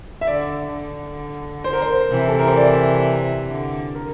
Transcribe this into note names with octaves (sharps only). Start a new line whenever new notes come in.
E5
D3 D5
D3
C5
A#4
C5
C3 E3
A4
A#4
C5
D5
D3
A#4